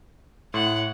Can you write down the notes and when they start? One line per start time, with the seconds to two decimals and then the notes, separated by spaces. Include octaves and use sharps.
0.54 A2 F#5 C6